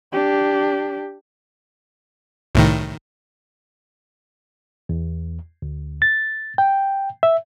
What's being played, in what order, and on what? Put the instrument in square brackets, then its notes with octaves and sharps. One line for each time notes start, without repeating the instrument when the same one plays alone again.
[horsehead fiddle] D4 G4
[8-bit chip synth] C2 A2 D#3
[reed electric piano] E2
D2
A6
G5
E5